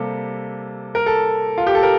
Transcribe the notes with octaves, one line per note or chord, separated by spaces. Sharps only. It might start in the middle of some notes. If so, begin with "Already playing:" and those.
Already playing: C3 G3 A#3 A4
A#4
A4
F4
G4
A4
A#4